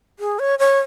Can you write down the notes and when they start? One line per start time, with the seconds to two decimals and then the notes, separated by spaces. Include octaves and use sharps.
0.19 G#4
0.39 C#5
0.59 C#5